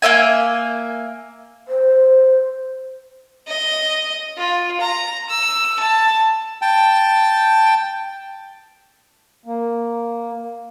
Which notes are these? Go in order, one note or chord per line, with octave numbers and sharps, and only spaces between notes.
A#3 B3 E5 G#5
C5
D#5
F4
A#5
E6
A5
G5 A5
A#3